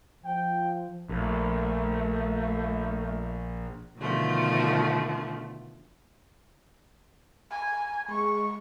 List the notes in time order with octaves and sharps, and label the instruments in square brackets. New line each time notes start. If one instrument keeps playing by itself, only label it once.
[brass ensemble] F3 [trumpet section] G5
[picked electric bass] A#1 [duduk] A3
[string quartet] B2 D3 D#3 F3 A3
[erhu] G#5
[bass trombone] G#3 [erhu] C#6